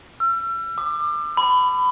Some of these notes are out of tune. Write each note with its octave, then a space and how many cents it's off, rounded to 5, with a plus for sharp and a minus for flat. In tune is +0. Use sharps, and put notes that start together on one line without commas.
E6 +40
D6 +30
B5 +25